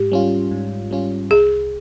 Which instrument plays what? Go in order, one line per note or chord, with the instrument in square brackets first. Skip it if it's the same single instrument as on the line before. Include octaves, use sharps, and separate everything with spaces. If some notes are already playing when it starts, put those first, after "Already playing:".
Already playing: [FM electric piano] G#2 [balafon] G4
[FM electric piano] G3 C#4 F4
G#2
G3 C#4 F4
[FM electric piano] C2 [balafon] G#4